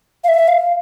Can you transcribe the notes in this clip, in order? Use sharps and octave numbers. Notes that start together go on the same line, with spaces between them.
F5
E5
F5